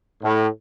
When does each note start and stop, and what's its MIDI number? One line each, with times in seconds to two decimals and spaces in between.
0.23 0.47 45